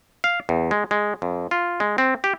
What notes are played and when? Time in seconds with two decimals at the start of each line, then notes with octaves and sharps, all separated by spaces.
0.24 F5
0.49 E2
0.71 G#3
0.91 G#3
1.22 F2
1.51 F4
1.80 G#3
1.98 C4
2.24 G4